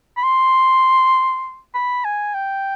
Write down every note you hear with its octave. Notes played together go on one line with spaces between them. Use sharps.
B5
C6
B5
G#5
G5